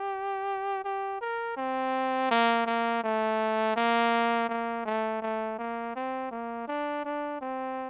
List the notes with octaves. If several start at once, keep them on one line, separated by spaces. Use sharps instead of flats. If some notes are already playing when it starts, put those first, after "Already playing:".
Already playing: G4
G4
A#4
C4
A#3
A#3
A3
A#3
A#3
A3
A3
A#3
C4
A#3
D4
D4
C4